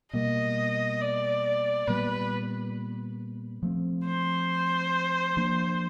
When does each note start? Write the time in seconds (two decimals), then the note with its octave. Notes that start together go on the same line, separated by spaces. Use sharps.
0.13 B2 G3 A#3 D#5
1.01 D5
1.87 A#2 G3 B3 B4
3.63 F3 A3 C4
4.07 C5
5.37 F3 A#3 D4